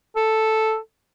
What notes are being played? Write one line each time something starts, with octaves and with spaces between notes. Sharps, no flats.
A4